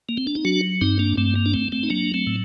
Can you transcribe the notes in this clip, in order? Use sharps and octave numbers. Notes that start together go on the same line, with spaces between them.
A#3
C4
D4
D#4
F#3 D4 F#4
G2 C4 D#4
A#3 D4
G2 A3 C4
A#3
D4
A3 C4
A3 C4
D#4
F#3 A#3 D4
A3 C4
A2